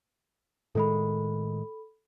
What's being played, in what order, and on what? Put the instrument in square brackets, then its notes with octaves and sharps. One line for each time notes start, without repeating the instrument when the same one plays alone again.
[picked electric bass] A2 D#3 G#3 [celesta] A4 B5